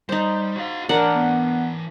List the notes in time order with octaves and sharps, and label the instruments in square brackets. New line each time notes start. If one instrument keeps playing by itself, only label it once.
[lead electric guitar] G3 [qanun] D#4 C5
[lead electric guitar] F#4 F5
[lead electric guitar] E3 C#5 [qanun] D4 A#4 F#5
[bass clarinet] B3